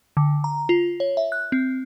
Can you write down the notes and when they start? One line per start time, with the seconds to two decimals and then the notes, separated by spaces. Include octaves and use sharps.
0.17 D3
0.44 A#5
0.69 F4
1.00 C#5
1.17 E5
1.32 F#6
1.52 C4